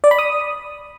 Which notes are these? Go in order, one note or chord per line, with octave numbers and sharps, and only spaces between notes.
D5
B5
D#6